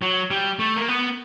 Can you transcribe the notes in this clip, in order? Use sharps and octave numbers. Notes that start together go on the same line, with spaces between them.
F#3
G3
A3
A#3
B3